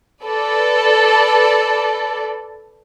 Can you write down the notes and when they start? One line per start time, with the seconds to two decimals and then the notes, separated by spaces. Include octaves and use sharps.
0.25 A4 B4 D5